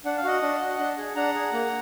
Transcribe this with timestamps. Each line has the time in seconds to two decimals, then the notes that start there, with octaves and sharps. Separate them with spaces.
0.05 D4 F#5
0.17 F5
0.24 F#4 D#5 F#5
0.42 D4
0.61 F#4
0.79 D4
0.98 G#4
1.16 D4 F#5 A#5
1.34 G#4
1.53 A#3